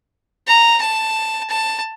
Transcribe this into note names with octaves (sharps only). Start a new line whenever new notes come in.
A#5
A5
A5